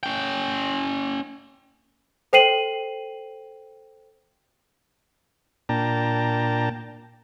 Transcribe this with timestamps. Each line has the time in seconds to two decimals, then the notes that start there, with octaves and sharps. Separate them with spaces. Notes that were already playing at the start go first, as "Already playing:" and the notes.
0.03 C#4 G5
2.33 A4 C5 G5 C7 D#7 F#7
5.69 A#2 D4 G5 A5 A#5